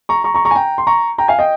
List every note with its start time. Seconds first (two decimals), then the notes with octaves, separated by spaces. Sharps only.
0.09 A#5 C#6
0.24 A#5 C#6
0.34 A#5 C#6
0.45 A#5 C#6
0.51 G#5
0.55 G5 A#5
0.78 C6
0.87 A#5 C#6
1.18 G5 A#5
1.28 F5 G#5
1.39 D#5 G5